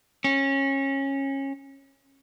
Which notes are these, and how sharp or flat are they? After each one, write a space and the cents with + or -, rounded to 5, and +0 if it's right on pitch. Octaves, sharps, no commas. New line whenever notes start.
C#4 -20